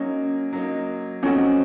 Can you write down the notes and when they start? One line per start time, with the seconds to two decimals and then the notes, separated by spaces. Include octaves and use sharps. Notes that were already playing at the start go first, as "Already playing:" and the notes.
Already playing: F#3 A#3 C#4 D#4
0.53 F#3 A#3 D#4
1.23 F3 A3 C4 C#4 D#4 F#4